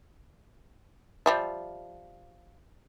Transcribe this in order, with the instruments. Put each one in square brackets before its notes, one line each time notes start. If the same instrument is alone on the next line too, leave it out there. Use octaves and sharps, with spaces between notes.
[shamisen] F3 G3 E5